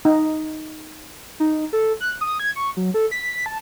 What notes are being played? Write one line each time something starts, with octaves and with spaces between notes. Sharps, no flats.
D#4
D#4
A4
F#6
D#6
G#6
C#6
F#3
A4
B6
A5